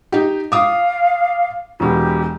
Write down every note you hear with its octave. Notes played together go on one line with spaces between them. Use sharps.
D#4 G4
F5 D6 D#6
E1 B2 G4